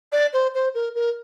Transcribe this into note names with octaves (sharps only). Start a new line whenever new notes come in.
D5
C5
C5
A#4
A#4